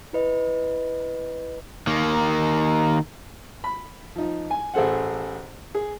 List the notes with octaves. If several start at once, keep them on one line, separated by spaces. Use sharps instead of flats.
E4 B4 D#5
D#3 A#3
B5
F3 D#4
G#5
A1 G#4 A4 C5 F#5
G#4